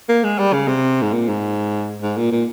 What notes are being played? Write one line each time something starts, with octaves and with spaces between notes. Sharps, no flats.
A#3
G#3
G3
C#3
C3
G#2
A#2
G#2
G#2
A#2
A#2